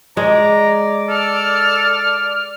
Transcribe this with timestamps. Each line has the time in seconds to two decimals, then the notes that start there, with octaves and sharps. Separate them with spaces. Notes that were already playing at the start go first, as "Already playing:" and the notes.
0.17 G#3 D5 A#5
1.08 A4 F6